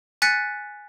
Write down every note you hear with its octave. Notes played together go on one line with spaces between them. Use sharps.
G#5 F#6 A6 B6 C#7